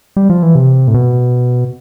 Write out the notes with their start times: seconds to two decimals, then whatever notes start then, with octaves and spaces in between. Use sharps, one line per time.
0.17 G3
0.30 F3
0.43 E3
0.55 C3
0.88 A2
0.94 B2